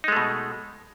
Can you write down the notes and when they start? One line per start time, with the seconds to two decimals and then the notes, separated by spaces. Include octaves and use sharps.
0.04 D#4
0.08 G#3
0.12 A3
0.16 B2